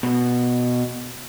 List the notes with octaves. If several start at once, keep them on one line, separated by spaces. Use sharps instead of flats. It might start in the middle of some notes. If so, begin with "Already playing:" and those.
B2